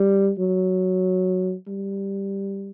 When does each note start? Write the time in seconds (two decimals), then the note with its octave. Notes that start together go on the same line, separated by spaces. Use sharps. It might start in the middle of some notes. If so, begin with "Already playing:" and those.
Already playing: G3
0.39 F#3
1.67 G3